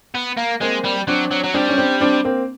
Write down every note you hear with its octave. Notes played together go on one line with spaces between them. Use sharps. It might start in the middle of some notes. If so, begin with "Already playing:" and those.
B3
A#3
G#3 A#3 C4
G3
F#3 C4 D4
F#3
F#3
G3 C4 D4
C#4
C4 D4
C4 D4
A#3 C4